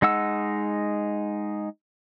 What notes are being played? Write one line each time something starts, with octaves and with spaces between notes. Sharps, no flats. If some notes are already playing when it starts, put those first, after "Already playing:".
G#3 D#4 F#5 E6